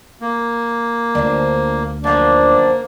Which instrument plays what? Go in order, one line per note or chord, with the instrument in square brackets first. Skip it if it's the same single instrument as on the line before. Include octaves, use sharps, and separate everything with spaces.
[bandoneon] A#3
[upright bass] D2 [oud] F3 D4
[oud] F#2 F3 [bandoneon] A#3 [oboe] D4